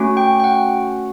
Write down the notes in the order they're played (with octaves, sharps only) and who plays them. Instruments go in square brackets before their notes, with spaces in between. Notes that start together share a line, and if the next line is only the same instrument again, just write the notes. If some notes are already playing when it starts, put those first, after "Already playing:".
Already playing: [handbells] A3 C#4 F#4
G5
G5
F#5